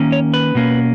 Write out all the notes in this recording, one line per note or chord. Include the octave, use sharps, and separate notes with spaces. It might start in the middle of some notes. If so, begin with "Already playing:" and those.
Already playing: D#3 A#3 C#4
C#5
B4
B2 A#3 C#4